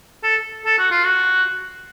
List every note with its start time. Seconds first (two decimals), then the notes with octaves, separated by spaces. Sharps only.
0.23 A4
0.65 A4
0.79 F#4
0.91 F4
1.05 F#4